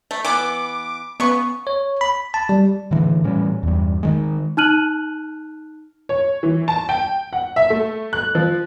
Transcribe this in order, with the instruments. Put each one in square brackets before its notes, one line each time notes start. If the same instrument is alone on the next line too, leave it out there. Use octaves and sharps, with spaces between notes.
[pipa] A3
[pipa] E3 B3 [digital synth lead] D6
[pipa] C#3 C#6 [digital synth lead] B3
[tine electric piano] C#5
B5
A5
G3
[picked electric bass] A2 D3 E3
A2 E3 G3 C#4
E2 G2
D#3 G#3
[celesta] D#4 A5 F6 F#6 D#7 F#7
[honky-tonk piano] C#5
E3
A5
G5
F#5
E5
A3
F#6
F3